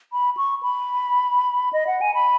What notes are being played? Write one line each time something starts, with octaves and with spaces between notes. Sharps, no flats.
B5
C#6
B5
D#5
F#5
G#5
B5